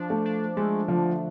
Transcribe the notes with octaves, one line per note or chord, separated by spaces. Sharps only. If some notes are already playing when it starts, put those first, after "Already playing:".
Already playing: F3 D4
A3
D4
G#3 A3
D3 F3